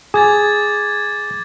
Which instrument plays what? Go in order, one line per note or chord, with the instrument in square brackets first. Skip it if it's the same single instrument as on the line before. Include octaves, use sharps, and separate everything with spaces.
[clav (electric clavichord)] G#4 [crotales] D6 G#6 A6